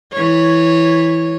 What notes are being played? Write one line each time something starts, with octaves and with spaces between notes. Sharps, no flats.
E3 C#5